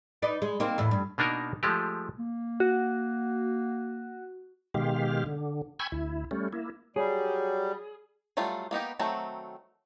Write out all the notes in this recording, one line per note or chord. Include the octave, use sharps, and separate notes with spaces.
D#4 B4 D5
G#3
A#3 C4 D#4
E2 A2
G2
B2 A#3 D4 D#4 A#4
F3 G#3 A3 G4
A#3
F#4
B2 D#3 G#3 G4 F5
D3
G5 G#5 B5 C#6 E6 G#6
D2 E4
G3 A3 C#4
A#3 E4
F#3 G3 G#4
F#3 G3 A3 F4
A#3 B3 D#4 G4
D#3 F#3 A3 C4 F#4